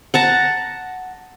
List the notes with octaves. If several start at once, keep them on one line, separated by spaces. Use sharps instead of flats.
F#5 A5 A#5